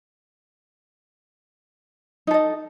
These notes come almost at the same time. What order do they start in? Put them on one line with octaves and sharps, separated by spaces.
D#4 A4 D#5